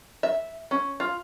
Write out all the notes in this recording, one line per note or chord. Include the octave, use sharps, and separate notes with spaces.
E5
C#4
F4